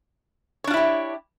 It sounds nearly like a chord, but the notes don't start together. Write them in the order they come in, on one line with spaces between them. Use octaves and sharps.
C#5 D4 F4 E4 G4